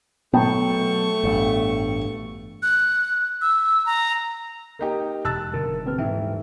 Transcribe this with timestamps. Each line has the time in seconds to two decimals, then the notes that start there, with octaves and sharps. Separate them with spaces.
0.33 B2 F#3 A3 B3 G5 A5 C#6
1.24 A1 G2
2.63 F#6
3.41 E6
3.86 A#5
4.79 A#3 D#4 G4
5.25 E1 A5 E6 F#6 A6
5.54 F#1 B2 D3 A#4
5.86 D#1 C4 B4 F6
5.98 G#2 E3 D#4 E5 G5